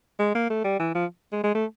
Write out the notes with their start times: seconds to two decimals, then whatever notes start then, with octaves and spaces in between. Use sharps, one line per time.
0.19 G#3
0.35 A#3
0.50 A3
0.64 G3
0.79 E3
0.95 F3
1.32 G#3
1.43 G#3
1.55 A3